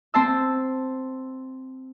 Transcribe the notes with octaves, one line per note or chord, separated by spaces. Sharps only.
C4 C5 A5 E6